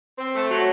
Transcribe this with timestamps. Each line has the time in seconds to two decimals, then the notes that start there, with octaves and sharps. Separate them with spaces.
0.18 C4
0.35 A3
0.50 F#3